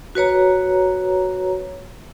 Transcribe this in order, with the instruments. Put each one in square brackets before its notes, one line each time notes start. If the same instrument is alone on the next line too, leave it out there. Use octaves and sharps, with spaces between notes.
[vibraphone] F#4 B4 C#5 A#5